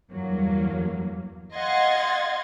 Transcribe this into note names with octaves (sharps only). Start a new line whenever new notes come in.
E2 G2 F#3 A#3
D#5 F5 F#5 C6 G#6 A6